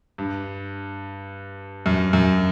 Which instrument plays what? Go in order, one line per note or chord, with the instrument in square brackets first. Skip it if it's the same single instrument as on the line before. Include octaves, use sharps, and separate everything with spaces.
[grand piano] G2
F#2
F#2